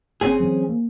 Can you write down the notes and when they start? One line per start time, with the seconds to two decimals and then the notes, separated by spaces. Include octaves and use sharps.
0.21 G1 C4 C#4 G#4
0.40 E3 F#3
0.69 A#3